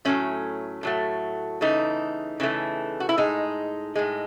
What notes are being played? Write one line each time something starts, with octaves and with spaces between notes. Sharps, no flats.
A2 F#3 A3 C#4
A2 F#3 A3
C#3 E3 A3 D#4
C#3 E3 A3
F#4
E4
A2 G#3 D#4
A2 G#3